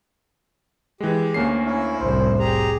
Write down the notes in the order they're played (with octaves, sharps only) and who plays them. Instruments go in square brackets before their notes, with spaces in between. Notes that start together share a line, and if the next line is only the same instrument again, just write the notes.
[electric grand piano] E3 G#3 [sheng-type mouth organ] G4
[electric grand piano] D2 A#3 C7 [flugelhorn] C#4
[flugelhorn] C#4 [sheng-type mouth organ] E4
[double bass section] F1 C2 A2 [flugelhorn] C5
[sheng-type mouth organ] G4 G#4 A#5